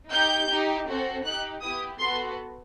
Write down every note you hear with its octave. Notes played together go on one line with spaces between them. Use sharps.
D#4 G4 G6
D#4 G4
C4 F#4 A4
D#4 G4 F#6
B3 E4 G4 D#6
B3 F#4 A4 C6